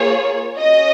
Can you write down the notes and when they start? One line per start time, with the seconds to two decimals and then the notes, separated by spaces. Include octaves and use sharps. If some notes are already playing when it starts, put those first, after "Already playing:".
Already playing: A#3 F4 G#4 C#5
0.57 C#4 F#4 D#5